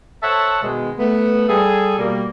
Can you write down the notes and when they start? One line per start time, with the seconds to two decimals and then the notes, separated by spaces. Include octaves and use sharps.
0.23 A4 C5 C#5 E5 F#5 A5
0.62 B2 D#3 G#3
0.98 A3 B3
1.48 G3 G#4 A4
1.98 B2 G3 A#3